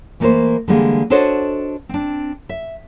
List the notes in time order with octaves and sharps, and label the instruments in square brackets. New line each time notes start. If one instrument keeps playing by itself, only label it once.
[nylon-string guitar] E3 A3 A#3 A4 A#4 C5
D3 E3 G3 G#3 A#3
D4 F#4 A4 C5 C#5 D#5
C4 D4
E5